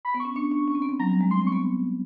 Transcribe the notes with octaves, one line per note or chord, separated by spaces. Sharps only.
B5
B3
C#6
C#4
D4 C#6
D4
C#4
C4
B3
C4
F#3 A#5
G3
G#3
B3 C6
C4
C#6
B3